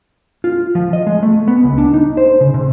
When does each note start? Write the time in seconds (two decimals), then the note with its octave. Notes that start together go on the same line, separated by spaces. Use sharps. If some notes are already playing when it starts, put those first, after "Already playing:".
0.44 F4
0.75 F3
0.93 D#5
1.07 G#3
1.23 A3
1.48 B3
1.64 C#2
1.78 D4
1.94 D#4
2.17 C5
2.41 C#3
2.54 C3